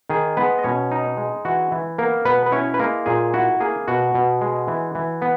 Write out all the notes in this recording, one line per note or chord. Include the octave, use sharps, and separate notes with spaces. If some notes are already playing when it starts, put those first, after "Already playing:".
D#3 G#4
G#3 B3 B4
D#5
B2 C#4 C#5
D#4
G#3
E3 F#4
E3
A#3 B3 A#4
B2 B3 B4
B4
C#4 E4 C#5
B4
G#3 A#3 A#4
A#2 G#4
E4 F#4
A#3 G#4
B2 F#4
B2
G#3
E3
E3
B3